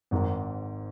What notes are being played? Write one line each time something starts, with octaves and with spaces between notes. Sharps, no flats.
G#1 G#2 D#3